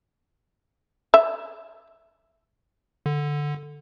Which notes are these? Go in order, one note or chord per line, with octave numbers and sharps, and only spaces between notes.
E5
D3